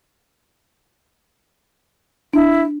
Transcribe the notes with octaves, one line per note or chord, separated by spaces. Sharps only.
D4 E4